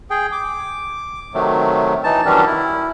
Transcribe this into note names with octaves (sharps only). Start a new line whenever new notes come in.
G#4 G5
D6
C3 D#3 F#3 A3
E3 D#4 A5
D#3 E3 F#3 G3 C#4 D4
E4